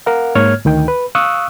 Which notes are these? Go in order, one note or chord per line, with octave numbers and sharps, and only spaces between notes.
A#4 F5 F#5
G#2 A#3 C#5 F6 G#6
D2 D#3 G5
B4
F5 C#6 D#6 E6 F#6